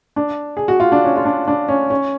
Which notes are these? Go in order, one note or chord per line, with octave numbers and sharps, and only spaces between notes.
D4
G#4
F#4
F4
D4
C#4
F4
D4
D4
C#4
C#4